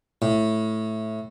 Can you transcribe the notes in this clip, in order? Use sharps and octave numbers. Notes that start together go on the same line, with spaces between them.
A2